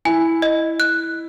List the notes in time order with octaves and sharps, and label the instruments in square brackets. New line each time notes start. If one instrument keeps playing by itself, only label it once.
[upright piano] E4 [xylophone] G#5
[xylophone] D#5
F#6